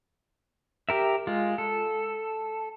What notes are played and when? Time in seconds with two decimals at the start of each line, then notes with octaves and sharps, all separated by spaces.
0.89 G4 A#4 E5
1.27 G#3 F4
1.58 A4